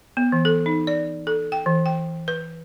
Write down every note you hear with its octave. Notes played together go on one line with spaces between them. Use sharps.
B3
E3
A4
D#4
D5
A4
G5
E3
G5
B4